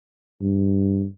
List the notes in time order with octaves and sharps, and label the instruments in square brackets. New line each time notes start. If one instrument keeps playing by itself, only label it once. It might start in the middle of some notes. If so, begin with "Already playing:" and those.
[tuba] G2